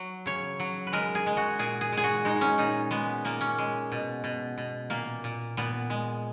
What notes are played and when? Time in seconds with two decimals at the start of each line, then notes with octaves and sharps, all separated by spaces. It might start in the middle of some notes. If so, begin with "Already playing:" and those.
Already playing: F#3
0.26 C#3 C#5
0.60 F#3
0.87 B4
0.93 G#3 A#4
1.15 G#4
1.26 G#3
1.37 F#4
1.59 A#2 G#4
1.81 G#4
1.92 G#3 G#4
2.04 F#4
2.25 G#3 D#4
2.41 C#4
2.58 A#2 D#4
2.91 G#3 B3
3.25 A#2 A#3
3.41 C#4
3.58 G#3
3.92 B2
4.24 B2
4.58 B2
4.90 A#2 A#3
5.24 A#2
5.57 A#2 B3
5.90 G#3